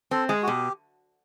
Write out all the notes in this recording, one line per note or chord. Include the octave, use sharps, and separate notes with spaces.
C4 A4
G#3 G#4
F#4
B2 G4